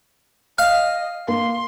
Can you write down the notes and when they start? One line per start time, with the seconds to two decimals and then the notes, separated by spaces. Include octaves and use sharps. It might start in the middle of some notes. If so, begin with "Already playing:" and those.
0.58 D#5 F5
1.28 A#3 C6